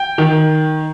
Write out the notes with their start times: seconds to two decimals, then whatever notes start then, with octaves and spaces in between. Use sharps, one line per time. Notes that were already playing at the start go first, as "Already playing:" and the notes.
Already playing: G5
0.18 D#3